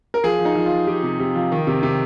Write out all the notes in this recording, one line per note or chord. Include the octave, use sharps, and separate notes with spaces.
A#4
F3 G#4
F3
D#4
F3
F4
F3
F3 G4
C3
C3
F3
D#3
C3
C3